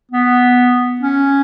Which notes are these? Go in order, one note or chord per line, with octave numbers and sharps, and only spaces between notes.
B3
C#4